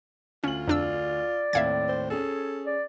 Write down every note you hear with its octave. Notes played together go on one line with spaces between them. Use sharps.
D2 C#4 F4 F#7
F2 D4 D5 E6
D#2 A2 C4 E5 F5 G#6
C5
C#4 G#4 A4
D5